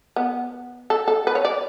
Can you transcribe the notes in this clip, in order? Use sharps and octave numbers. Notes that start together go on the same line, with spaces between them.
B3
A4
A4
B4
C#5
D5